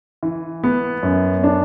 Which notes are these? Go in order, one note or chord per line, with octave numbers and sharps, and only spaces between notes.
E3
B3
F#2
D4